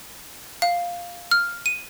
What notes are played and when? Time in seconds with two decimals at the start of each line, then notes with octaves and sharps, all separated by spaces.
0.62 F5
1.31 F6
1.66 D#7